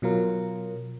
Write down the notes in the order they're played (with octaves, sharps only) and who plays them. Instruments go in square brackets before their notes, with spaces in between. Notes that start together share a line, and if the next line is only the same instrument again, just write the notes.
[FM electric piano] B2 F#3 F4 A#4